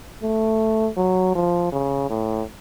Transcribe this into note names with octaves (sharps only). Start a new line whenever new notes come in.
A3
F#3
F3
C#3
A2